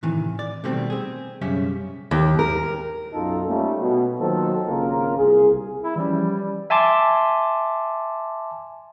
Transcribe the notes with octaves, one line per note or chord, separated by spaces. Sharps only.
A2 C3 D#3 E3
D5
B2 D#3 G3 A3 C4
C4 G#4
B1 F#2 C#3 G3 C#4 E5
D#2
A#4
B1 F#2 D#4 F4 A4
G3 A3 A#3 C#4 D#4 F4
B2
D#3 F#3 A#3 F4 A4 C5
G#1 C#3 A#3 F4 A#4
C2 G#4
E4
E3 F3 G3 C#4
E5 G#5 A5 C6 D6